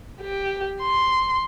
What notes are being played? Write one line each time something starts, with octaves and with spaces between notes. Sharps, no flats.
G4
C6